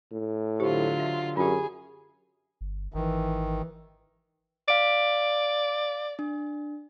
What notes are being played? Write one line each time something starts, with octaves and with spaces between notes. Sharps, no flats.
A2
D3 F#3 F4 G4 C5
E5
F#2 F4 G4 G#4
G1
G#1 D#3 E3
D5 F5 D7
D4